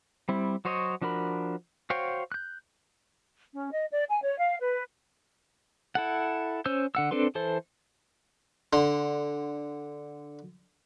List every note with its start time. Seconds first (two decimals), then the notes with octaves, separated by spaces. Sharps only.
0.29 G3 C4 E4
0.65 F#3 F#4 C5 C#5 D#5
1.01 F3 D4 F#4 A#4 B5
1.90 F#4 C5 C#5 F5 G5
2.32 F#6 G6
3.55 C#4
3.71 D#5
3.92 D5
4.10 G#5
4.23 C#5
4.38 F5
4.61 B4
5.95 E4 A4 F#5
6.65 C#4 C5 E6 G6
6.95 D3 F#5 E6
7.11 C4 D4 A4 B4 C6
7.35 E3 A4 C5
8.73 D3 C6